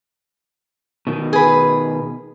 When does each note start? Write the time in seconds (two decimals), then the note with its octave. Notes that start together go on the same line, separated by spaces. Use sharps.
1.07 B2 D#3
1.33 G#4 B4